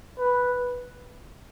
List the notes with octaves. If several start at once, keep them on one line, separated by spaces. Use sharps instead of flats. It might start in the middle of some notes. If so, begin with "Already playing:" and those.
B4